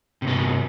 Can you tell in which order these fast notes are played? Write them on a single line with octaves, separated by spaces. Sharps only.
C3 G2 B3